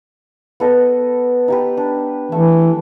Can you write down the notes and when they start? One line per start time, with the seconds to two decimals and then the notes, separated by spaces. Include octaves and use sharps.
0.60 B3 A4 D#5
1.48 D#4 G4 B4
1.77 D4
2.32 E3 A3